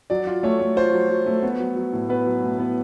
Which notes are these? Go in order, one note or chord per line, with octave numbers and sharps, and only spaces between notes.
F#3 D5
F4
A3 C#5
A3
F4 C5
F#3
F#3
A3
B3
F#3
F#3
A2
B3 B4
F#3
A2
B3